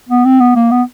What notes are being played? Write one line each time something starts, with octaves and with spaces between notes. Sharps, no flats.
B3
C4
B3
A#3
B3